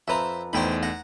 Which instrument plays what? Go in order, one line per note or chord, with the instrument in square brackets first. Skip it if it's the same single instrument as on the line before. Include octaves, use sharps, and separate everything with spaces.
[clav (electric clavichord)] F2 B4 A#5 [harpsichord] C5 E5
[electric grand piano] E2 A3 D#4 [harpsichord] C5 G5 B5
[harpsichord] F#5 A#5